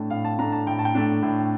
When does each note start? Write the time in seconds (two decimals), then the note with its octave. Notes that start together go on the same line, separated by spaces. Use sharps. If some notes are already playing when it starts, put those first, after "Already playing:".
Already playing: A2 A3 D4 A5
0.10 A2 F5
0.25 A5
0.39 A3 D4 A#5
0.52 A5
0.67 A2 G5
0.79 A5
0.85 G5
0.95 A3 D4
1.22 A2